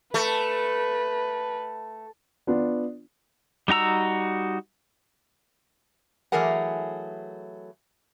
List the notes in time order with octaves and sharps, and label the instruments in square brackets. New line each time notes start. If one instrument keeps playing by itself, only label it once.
[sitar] A3 [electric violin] B4
[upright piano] B3 D4 F4
[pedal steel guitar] G3 D#4 F#4 A#5 E6
[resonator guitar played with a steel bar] E3 F#3 A3 G#4 A#4 F#5